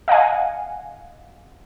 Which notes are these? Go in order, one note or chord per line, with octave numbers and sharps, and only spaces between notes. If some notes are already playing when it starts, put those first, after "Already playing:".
D#5 F5 F#5 G#5